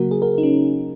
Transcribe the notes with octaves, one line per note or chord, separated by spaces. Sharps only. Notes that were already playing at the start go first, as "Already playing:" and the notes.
Already playing: C#3 F#3 A#3 F#4 A#4
G#4
F#4 A#4
D#4
C#4